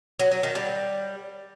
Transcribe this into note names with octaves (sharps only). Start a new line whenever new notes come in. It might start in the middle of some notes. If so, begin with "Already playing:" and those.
F#3
F#3
D#3
G3